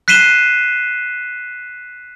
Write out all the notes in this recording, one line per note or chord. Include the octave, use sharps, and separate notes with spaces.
F#6 B6 C7 D#7 E7 G7